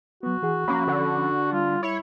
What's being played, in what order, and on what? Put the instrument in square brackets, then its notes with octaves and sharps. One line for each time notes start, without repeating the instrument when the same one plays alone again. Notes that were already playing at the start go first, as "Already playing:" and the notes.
[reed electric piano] F#3 B3 [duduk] F#4
[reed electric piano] E3 G#4 F#5
[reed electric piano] F3 C#4 B5 [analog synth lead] A#3
[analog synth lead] D3
[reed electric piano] G3 [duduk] F4
[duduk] E4 [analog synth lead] C#5